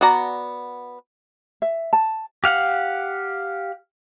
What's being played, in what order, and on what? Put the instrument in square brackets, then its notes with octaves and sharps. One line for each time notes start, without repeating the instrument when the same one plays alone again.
[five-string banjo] B3 F#4 D5 A#5
[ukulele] E5
A5
[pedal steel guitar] G4 F5 F#5